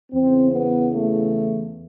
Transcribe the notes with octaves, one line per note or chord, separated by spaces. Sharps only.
E2 C#3 E3 C4
B3
A3